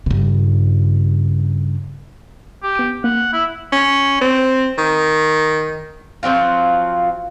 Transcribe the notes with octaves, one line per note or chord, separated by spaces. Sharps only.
G2 C#3
G4
B3 D7
A#3 F#5
E4
C#4
C4
D#3
F3 F#3 C4 F4